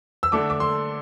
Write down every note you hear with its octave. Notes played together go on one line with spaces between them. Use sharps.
E6
D3 A3 D4 D6
D6
C6